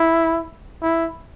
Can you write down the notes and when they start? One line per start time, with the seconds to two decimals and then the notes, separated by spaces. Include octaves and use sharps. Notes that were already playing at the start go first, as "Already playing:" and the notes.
Already playing: E4
0.82 E4